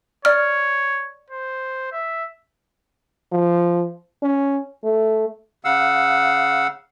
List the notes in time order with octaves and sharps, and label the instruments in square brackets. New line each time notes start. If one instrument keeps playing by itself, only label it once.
[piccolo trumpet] C#5 [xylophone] D5 F6
[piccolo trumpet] C5
E5
[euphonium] F3
C#4
A3
[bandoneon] C#3 F5 F#5 E6